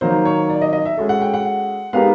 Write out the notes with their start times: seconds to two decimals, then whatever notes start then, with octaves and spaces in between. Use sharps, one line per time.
0.01 D#3 F#3 A#3 D#4 C5
0.25 C#5
0.49 D5
0.62 D#5
0.73 D#5
0.86 E5
0.97 G#3 C#4 F#4 A4
1.09 F#5
1.22 G5
1.34 F#5
1.93 G#3 B3 D#4 G4 A#4 F5